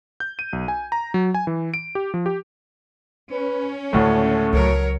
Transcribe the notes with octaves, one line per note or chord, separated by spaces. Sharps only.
G6
D#7
B1
G#5
A#5
F#3
G#5
E3
D7
G4
F3
G4
C#4 B4
D2 A2 C#3 G#3 A3
C#2 F#3 A#4 C#5